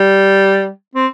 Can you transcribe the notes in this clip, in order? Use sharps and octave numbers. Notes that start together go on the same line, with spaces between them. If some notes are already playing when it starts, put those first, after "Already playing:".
Already playing: G3
C4